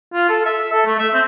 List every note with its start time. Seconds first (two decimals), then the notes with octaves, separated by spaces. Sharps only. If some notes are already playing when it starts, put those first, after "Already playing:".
0.13 F4
0.29 A4
0.46 E5
0.72 A4
0.86 A3
0.99 E5
1.14 C4